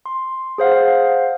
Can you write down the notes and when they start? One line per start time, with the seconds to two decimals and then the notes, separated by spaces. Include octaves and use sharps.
0.06 C6
0.58 G#4 C5 F5 F#5